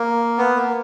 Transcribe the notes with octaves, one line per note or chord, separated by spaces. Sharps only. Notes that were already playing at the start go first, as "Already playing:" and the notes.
Already playing: A#3
B3
A#3